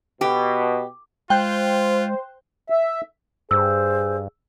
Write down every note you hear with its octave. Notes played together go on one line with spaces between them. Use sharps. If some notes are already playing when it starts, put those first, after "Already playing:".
B2 G4
G#3 F4 C5 G5 F#6
E5
G2 G#4 C5 E6